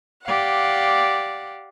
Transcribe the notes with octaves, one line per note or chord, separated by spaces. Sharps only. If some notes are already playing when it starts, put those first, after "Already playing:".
G4 D5 F5 F#5